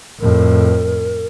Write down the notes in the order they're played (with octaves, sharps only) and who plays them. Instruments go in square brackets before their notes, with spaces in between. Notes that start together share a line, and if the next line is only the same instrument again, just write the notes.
[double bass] F2 A2 [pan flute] A#4